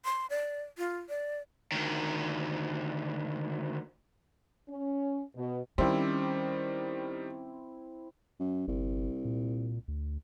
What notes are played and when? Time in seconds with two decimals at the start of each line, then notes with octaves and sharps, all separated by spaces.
0.05 C6
0.30 D5
0.78 F4
1.09 D5
1.72 D2 D#3
4.69 C#4
5.35 B2
5.78 D#3 G3 C4 C#4 E4 D6
8.40 F#2
8.68 G1 C2
9.25 A#2
9.88 D2